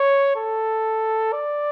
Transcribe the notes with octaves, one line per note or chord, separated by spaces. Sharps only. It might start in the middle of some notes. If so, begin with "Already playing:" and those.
Already playing: C#5
A4
D5